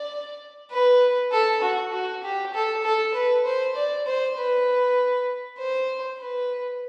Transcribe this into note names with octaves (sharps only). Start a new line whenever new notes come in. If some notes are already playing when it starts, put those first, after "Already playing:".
Already playing: D5
B4
A4
F#4
F#4
G4
A4
A4
B4
C5
D5
C5
B4
C5
B4